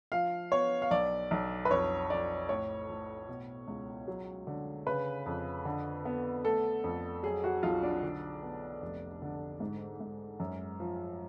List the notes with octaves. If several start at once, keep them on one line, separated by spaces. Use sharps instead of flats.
F3 F5
B3 C#5
F5
B1 D5
B1
B4
F2 C#5
F2 D5
A2 C#5
A2
B2
C#2
F#3
D3
C#3 B4
F2
D3
B3
A3 A4
F2
F#3 G#4
F#4
B1 F4
D4
D3
B3
F1
D3
G#2
G#2
F#2
F3